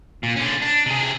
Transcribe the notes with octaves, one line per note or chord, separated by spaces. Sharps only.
A#2
D3 C#4
D4
C3 G#4